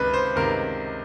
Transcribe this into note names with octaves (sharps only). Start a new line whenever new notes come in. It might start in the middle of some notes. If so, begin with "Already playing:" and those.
Already playing: C#2 C3 D#3 B4
C5
C#2 C3 D#3 A#4